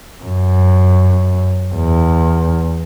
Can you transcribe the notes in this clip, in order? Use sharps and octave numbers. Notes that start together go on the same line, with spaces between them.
F#2
E2